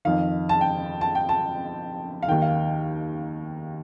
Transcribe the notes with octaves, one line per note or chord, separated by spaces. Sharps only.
F2 D#3 F5
A5
G5
A5
G5
A5
F5
D#2 D#3 G5
F5